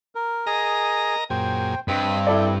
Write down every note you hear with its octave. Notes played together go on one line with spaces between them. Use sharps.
A#4
G#4 A#4 D#5 G#5 A#5
F#2 A#2 G#4 C5 G5
G2 C4 D#5 B5
E4 G4 A4 D5